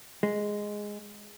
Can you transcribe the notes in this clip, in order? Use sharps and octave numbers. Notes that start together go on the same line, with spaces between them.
G#3